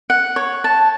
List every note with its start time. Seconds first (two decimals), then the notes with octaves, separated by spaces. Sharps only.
0.10 F#5
0.36 C#5
0.64 A5